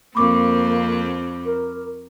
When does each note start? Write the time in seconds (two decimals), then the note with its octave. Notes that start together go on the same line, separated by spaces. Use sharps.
0.15 F2 A#3 C4 B5 C#6 D6
1.45 A#4